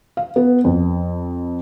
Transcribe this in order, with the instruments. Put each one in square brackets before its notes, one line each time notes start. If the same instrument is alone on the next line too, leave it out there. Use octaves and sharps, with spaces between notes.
[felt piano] F5
B3
F2